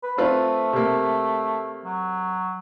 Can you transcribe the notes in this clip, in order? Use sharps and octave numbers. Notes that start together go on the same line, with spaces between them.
B4
A3 C4 F4 B4
C3 A#3
F#3